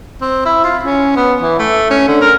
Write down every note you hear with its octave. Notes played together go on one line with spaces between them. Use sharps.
C4
E4
F4
C#4
B3
E3
A3
C#4
D3
A#4